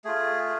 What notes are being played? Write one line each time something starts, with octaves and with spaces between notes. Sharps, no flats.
A3 F4 G#4